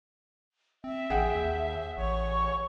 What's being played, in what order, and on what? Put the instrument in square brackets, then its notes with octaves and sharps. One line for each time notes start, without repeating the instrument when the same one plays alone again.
[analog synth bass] C4 [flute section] E5
[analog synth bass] A1 [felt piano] G#4 F#5 G5
[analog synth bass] D#2
[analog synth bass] A1 [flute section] C#5 C#6